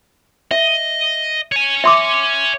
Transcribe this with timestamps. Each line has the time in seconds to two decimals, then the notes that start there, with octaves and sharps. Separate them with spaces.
0.51 D#5 E5
1.52 C#5 G#5
1.84 E5 C6 D6